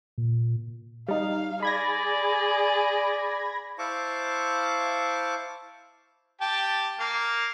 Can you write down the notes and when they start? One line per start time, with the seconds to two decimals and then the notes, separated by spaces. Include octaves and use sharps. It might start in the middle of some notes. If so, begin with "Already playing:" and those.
0.18 A#2
1.08 G3 D#4 F5
1.63 G#4 D5 B5 G#6 A#6
3.79 E4 C5 F5 A5 C#6 D6
6.41 G4 G5 A5
7.00 A#3 F5